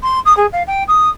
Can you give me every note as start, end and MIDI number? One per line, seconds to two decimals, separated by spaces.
0.02 0.19 84
0.25 0.35 87
0.37 0.46 68
0.52 0.63 77
0.67 0.83 79
0.88 1.09 87